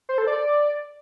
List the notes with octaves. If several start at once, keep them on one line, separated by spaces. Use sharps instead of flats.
C5
A4
D5